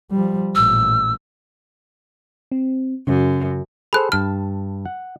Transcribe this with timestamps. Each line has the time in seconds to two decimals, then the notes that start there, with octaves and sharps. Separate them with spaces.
0.11 F3 G3
0.55 A1 A#2 E6
2.52 C4
3.07 F#2 C#3
3.93 G#4 A4 C5 B5 F#6
4.12 G2 A5 F6
4.86 F#5